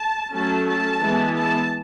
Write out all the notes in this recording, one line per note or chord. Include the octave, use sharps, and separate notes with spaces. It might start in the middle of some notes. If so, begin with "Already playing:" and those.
Already playing: A5
F#3 A3 C#4 A5
A5
E3 G#3 B3
A5